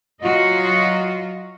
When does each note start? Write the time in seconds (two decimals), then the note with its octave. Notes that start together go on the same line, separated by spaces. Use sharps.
0.21 F#3 F4 F#4 D#5